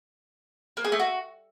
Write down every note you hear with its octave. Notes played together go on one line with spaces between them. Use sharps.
A#3
G#4
A3
F#4